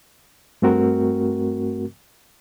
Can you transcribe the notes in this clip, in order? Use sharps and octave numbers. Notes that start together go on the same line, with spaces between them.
G2 A3 C4 F#4 A#4